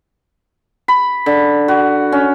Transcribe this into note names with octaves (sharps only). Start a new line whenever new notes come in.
B5
D3
F#4
C#4